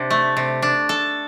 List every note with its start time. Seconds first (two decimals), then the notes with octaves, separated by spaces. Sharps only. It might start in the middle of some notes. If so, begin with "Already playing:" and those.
Already playing: C3 D4
0.10 A3
0.37 C3
0.62 D4
0.89 A4